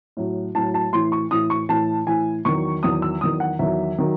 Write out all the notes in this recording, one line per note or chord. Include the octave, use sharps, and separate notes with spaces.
A2 F#3
A2 F#3 A5
A5
A2 E3 C6
C#6
A2 E3 D#6
C#6
A2 E3 A5
A2 E3 G#5
E2 D#3 F#3 C#6
E2 D#3 F#3 D#6
E6
E2 D#3 F#3 D#6
F#5
E2 D#3 F#3 E5
D#3 F#3